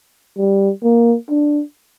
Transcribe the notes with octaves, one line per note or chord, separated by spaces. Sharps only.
G3
A#3
D4